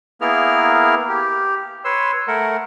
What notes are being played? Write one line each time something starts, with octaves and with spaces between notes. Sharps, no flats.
A#3 B3 E4 G#4 A#4 F6
G4
B4 C#5 C6 E6
A3 A#4 F#5